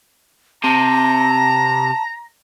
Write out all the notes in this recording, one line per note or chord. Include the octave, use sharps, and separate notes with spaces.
C3 A5 A#5